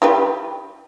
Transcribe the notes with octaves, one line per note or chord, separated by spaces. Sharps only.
E4 G4 B4